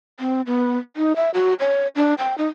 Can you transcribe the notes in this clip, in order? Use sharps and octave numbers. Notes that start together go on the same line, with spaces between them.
C4
B3
D#4
E5
F#4
C#5
D4
G5
D#4